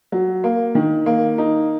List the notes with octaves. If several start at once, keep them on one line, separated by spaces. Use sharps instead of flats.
F#3
A#3
D#3
A#3
D#4